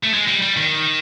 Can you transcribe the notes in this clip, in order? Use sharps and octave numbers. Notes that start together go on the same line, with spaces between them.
A3
G#3
G3
G3
D#3